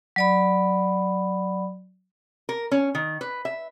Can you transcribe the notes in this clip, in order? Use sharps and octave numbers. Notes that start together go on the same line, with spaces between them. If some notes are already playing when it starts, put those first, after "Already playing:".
F#3 D5 B5
A#4
C#4
D#3
B4
E5